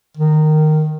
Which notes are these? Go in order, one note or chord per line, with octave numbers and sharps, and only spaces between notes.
D#3